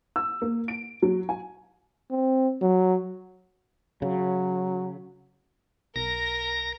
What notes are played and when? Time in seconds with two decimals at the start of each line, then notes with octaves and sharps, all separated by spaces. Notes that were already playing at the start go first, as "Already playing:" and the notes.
0.16 E6
0.42 A#3
0.68 D7
1.02 F#3
1.29 G#5
2.11 C4
2.61 F#3
4.02 C#3 F#3
5.96 B1 A#4 A#6